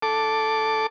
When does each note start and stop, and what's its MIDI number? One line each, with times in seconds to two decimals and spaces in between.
0.02 0.87 69
0.02 0.87 86